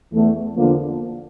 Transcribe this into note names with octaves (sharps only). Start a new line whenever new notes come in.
E2 E3 A3
E2 D3 F3 A#3